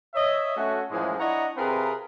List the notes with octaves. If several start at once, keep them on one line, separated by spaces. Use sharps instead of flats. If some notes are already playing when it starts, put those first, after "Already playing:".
C#5 D#5 E5
A3 C#4 F#4
F#2 A2 E3 F3 G#3
D4 E4 C#5 D#5 F#5 A#5
C3 C4 F4 G#4 A#4 B4